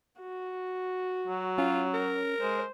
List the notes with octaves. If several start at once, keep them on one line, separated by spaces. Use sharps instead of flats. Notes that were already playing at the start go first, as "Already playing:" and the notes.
F#4
F#3
C#4 F4
A#4
G#3 C5